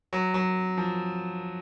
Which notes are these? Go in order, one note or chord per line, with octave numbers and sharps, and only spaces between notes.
F#3
F#3
F3